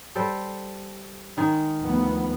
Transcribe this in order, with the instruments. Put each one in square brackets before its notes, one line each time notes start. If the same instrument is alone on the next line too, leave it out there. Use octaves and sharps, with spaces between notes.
[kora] G3 A4 C5
D#3 G#3
[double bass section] D2 F3 B3